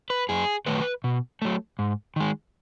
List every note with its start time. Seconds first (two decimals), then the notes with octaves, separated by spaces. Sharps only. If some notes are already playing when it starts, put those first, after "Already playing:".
0.10 B4
0.29 F#2 G#4
0.66 D#3 F#3 A3 B4
1.04 B2
1.42 F#3 A3
1.79 G#2
2.16 D#3 G#3